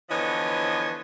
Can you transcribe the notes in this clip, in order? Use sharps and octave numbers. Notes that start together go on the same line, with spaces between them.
D3 E3 F3 B3 C#5 D#5